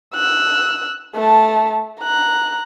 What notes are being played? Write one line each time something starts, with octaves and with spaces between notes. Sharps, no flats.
E6 F#6
A3 A5
A#5 F#6